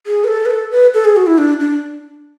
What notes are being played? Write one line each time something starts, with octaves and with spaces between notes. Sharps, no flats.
G#4
B4
A4
B4
A4
B4
A4
G#4
F#4
E4
D4
D4